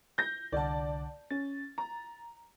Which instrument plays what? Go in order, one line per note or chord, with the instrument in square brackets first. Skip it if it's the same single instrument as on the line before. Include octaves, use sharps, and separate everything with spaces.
[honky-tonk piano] G6 A#6
[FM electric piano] C2 D3 F#5 [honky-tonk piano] D5 A5
[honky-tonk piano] C#4 [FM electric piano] A6
[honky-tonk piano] A#5